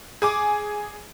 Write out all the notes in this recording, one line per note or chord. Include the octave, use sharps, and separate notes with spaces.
G#4 G#5 D6